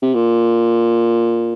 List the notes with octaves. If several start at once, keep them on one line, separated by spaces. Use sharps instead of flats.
C3
A#2